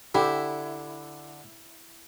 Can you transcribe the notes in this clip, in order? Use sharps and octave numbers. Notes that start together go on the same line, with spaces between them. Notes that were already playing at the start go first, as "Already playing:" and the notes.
D3 E4 G4